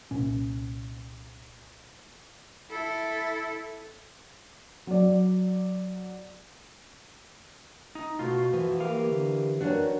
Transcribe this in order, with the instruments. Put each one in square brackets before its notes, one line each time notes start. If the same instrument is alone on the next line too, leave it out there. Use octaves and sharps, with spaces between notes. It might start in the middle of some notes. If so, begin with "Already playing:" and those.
[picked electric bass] C2 A#2 C#4
[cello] E4 A4
[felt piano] F#3 D5
[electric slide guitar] D#4
[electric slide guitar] B2 A3 F4 [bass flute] F#4
[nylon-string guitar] E3 [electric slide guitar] F3
[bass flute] A#3 [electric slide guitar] G4 A#4 F5
[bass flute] D3
[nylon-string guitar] D#3 C#4 D4 [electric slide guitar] F#4 [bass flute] B4